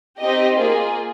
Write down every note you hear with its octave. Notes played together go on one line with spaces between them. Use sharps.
C4 D#4 G4 D#5
A#3 F4 G#4